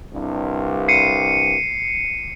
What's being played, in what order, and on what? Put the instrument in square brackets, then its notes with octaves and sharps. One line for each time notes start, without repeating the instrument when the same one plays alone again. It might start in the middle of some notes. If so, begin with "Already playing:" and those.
[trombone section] C2 G2
[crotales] C7 C#7 D#7